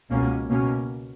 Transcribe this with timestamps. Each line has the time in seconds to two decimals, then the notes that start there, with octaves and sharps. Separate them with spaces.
0.10 C#2 B2 A#3 C#4
0.49 B2 A#3 C#4